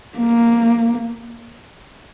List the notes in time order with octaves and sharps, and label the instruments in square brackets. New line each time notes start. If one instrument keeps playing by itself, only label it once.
[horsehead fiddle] A#3